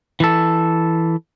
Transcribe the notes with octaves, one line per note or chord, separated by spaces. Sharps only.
E3 A4